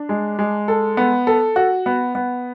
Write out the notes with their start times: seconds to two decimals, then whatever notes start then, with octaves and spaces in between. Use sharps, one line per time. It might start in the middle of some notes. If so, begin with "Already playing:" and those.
Already playing: D4
0.09 G#3
0.39 G#3
0.68 A4
0.97 B3
1.27 A4
1.56 F#4
1.86 B3
2.15 B3